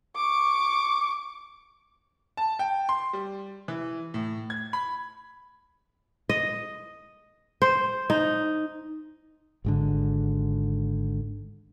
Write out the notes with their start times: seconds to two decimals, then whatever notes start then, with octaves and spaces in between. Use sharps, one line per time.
0.16 C#6 D6
2.37 A5
2.59 G5
2.89 C6
3.13 G3
3.68 E3
4.14 A2
4.50 G#6
4.73 B5
6.29 D#5
7.62 C5
8.10 D#4
9.65 G#1 G#2 D3